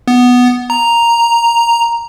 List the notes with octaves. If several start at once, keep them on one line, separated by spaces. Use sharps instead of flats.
B3
A#5